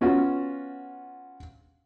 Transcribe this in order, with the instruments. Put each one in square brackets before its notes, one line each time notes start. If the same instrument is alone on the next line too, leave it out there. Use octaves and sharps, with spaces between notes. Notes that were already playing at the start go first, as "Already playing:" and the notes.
[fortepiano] B3 C#4 F4 F#4